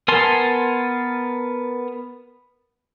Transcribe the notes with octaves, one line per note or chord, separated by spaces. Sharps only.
B3 A#4 G#5 A5 C6